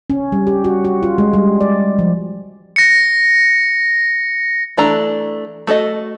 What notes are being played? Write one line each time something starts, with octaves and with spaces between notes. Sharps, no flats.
C#4
G3
G4
F#4
F#4
F4
G#3
G3
D5
F3
A#6 C#7
E3 A3 D4 A4 A#5
A3 F#4 A4 D#5